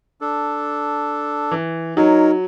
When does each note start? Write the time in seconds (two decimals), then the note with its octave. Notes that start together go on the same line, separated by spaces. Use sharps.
0.21 D4 A4
1.51 E3
1.97 F#3 D#4 A#4 C#5